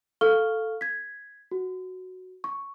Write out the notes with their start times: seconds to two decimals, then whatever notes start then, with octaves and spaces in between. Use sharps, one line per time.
0.21 A4 F5 C#6 F6 G7
0.81 G#6 B6
1.51 F#4
2.44 C#6